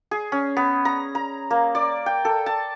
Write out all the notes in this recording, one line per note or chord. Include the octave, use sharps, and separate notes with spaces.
G#4
C#4
B3
A#5
A#5
A#3
D5
G5
A4
A5